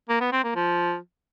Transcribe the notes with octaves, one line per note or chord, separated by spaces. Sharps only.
A#3
B3
C4
A#3
F3